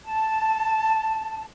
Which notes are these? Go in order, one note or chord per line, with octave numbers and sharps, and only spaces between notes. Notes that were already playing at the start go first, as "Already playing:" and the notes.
A5